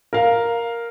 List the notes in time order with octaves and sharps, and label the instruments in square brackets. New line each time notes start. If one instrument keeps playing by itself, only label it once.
[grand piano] A#4 F5